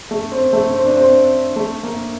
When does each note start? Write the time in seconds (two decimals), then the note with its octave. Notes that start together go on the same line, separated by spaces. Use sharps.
0.11 A3
0.32 C4
0.53 A3
0.72 C4
0.85 D4
0.97 C4
1.56 A3
1.83 A#3